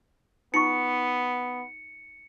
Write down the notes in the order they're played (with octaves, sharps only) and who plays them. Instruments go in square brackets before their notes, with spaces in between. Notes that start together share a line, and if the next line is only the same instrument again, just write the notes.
[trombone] B3 [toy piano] D#4 F4 C#6 [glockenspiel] C#7